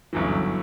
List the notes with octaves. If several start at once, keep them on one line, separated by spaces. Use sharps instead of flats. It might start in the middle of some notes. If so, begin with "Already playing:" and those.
G1 F#2 E3